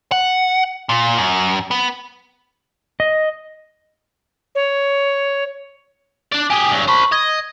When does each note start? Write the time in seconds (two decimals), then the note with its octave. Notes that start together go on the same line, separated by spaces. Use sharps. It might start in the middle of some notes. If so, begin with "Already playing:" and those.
0.12 F#5
0.89 A#2
1.18 F#2
1.71 B3
3.00 D#5
4.55 C#5
6.32 D4 D5
6.50 G4 G#4 G#5
6.71 G2 F#3
6.88 C5 A5 B5 C#6
7.12 D#5 G#6